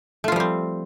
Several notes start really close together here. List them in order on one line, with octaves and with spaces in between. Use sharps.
A3 F4 F3 G3 C4